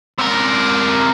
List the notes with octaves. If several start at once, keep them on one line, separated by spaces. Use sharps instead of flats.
C3 A#4